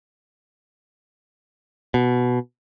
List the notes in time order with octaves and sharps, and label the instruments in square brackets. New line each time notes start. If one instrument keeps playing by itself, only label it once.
[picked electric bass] B2